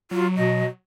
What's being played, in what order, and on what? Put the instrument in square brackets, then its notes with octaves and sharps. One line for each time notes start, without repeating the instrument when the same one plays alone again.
[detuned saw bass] F#3 [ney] F4
[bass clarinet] B2 [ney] D#5